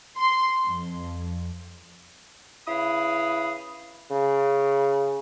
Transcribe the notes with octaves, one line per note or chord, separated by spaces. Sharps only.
C6
F2
C#3 E4 B4 F5 B5 D#6
C#3